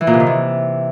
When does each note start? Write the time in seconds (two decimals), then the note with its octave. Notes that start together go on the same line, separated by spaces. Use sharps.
0.01 E3
0.07 A#2
0.14 C3
0.20 D#3
0.27 E3